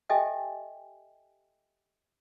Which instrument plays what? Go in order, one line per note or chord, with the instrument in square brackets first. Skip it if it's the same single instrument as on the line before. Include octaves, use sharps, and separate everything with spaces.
[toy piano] G4 A4 D#5 E5 G5 G#5